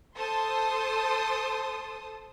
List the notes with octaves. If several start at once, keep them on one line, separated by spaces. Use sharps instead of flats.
A4 C5 A5 C6 D#6